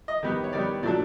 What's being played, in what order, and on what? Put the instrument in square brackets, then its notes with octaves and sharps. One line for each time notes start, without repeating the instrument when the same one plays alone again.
[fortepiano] D#5
D#3 G3 B3
C#5
D#3 G3 B3 D5
A#2 F#3 A3 D4 D5